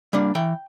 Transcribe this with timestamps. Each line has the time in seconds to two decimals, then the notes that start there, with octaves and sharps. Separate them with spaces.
0.13 G3 A#3 D4
0.35 E3 G5